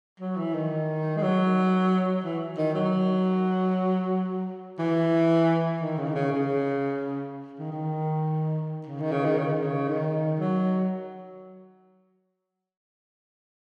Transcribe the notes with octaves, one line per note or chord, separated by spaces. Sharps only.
F#3
E3
D#3
G#3
F#3
E3
D#3
F#3
E3
D#3
C#3
D#3
C#3
C#3
D#3
D#3
C#3
D#3
C#3
D#3
C#3
D#3
C#3
D#3
F#3